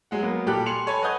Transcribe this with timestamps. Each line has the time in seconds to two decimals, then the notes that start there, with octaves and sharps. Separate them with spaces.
0.11 F#3 G#3 F#5
0.23 F#3 A#3 B3
0.46 A#2 G3 G4 A4 F#6
0.66 G#5 C6 C#7 F7 F#7
0.87 A4 C#5 G#5 A5 B5
1.03 B4 D#5 F#5 D#6 G6 G#6